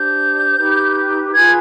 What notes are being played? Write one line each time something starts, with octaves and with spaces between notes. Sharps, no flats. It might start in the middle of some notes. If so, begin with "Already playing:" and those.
Already playing: D4 G4 C5 G6
D#4 G4 B4
F4 G#4 B4 G#6